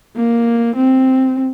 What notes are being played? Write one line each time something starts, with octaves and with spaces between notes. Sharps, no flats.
A#3
C4